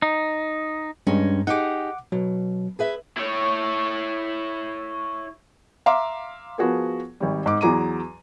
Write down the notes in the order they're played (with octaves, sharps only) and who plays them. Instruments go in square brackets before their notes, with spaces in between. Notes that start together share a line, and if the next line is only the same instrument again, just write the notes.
[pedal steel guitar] D#4
[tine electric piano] G2 [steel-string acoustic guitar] G#3 C#4 D#4
[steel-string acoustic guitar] D#4 G4 G#4 [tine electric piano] F#5 D6
[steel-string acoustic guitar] B2 [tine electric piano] F#3
[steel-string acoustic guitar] G#4 B4 E5
[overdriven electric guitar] E4 C#5
[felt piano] E5 F5 A#5 C6 D6
F3 B3 F#4 G#4 A#4
G#1 G3
G#2 D6
E2 F#3 G#4 A#5 D6 D#7